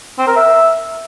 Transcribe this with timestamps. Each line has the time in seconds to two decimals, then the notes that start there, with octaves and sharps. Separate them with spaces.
0.18 C4
0.27 A#4
0.36 E5